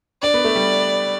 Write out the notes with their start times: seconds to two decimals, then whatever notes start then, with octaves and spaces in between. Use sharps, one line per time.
0.23 D4 D5
0.34 B3
0.44 A3
0.56 G3